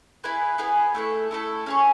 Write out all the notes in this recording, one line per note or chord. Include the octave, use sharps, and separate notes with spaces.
B3 E4 G#4 B4
B3 E4 G#4 B4
A3 E4 A4
A3 E4 A4
C#4 G#4 C#5